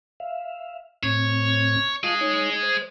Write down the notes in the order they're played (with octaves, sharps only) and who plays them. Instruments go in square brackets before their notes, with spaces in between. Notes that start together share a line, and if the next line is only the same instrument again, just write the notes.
[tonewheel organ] E5 F5
[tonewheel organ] A2 C4 [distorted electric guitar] C#5
[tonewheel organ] F4 F5 A5 [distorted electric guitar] G#4 D#5
[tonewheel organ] D#4 C#5
C5